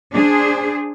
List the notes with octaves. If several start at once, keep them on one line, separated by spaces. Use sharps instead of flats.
D4 G#4 C5